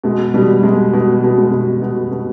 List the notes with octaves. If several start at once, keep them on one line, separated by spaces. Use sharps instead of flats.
B2 G#3
B2 G3
B2 G#3
B2
B2
G#3
B2
B2
B2